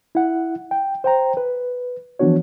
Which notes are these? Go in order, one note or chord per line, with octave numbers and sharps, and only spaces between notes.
E4 F#5
G5
C5 G5 A#5
B4
E3 F3 B3 D4 F#4 C#5